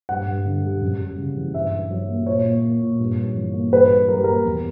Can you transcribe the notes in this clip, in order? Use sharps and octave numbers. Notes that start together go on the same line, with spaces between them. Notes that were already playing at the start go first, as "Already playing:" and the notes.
G2 F#5
G2
D3
G3
F#2
G3
C#3
E3
G2 E5
G2
F#3
A#3
A#2 C#5
A#3
A#3
A#2
G2
G2
E3
A#3
G2 B4
G2
F#3 A#4
G4
A#3 A#4
E2